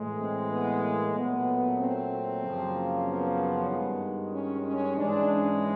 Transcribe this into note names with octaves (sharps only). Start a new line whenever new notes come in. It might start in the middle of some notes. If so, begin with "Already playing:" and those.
Already playing: A2 E3 G#3
C4
B3
A#3
A#2 F#3 A3 B3
C4
F#2 C#3 F3 A#3
B3
G2 D#3 G#3
C#4
C#4
G#2 E3 G#3 D4
C#4